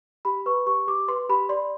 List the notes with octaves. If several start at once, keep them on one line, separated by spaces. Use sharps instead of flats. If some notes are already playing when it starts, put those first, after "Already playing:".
G4 B5
B4 C#6
G4 C#6
G4 D6
B4 C6
G4 B5
D5 C6